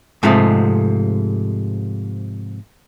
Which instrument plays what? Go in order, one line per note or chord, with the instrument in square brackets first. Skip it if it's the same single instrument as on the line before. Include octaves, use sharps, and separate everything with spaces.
[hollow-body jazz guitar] G#2 C3 F3 G#3 A3